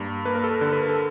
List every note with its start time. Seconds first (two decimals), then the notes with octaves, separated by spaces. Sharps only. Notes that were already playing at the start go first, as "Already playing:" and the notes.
Already playing: G2 A#3
0.25 A#3 B4
0.35 A#4
0.44 A4
0.52 A#4
0.61 D3
0.73 B4
0.82 A#4
0.89 A4